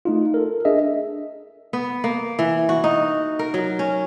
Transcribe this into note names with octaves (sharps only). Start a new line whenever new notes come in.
A3 D#4 F4
A4 A#4
D4 G#4 D#5 E5
B3
A#3
E3
F#4
D#4
A#4
F#3
C#4